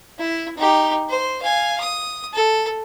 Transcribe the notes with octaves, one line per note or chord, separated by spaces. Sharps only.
E4
D#4 G4
C5
F5 G#5
D#6
A4